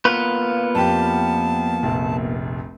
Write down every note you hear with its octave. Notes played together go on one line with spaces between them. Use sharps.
A#3 B3 F4 B4
F2 G4 A5
F1 A#1